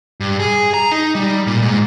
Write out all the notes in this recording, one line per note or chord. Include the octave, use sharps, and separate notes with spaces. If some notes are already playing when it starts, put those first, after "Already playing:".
G2
G#4
A#5
D#4
G3
A#2
G#2